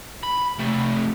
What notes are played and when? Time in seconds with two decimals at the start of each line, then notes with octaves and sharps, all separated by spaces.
0.23 B5
0.59 C3 A3